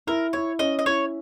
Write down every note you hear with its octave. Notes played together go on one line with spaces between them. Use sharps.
E4 A#4
E4 C#5
C#4 D#5
D#5
E4 C#5